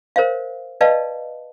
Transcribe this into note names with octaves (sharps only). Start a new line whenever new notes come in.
A#4 C5 C#5 E5 F5
B4 D5 D#5 F5 A5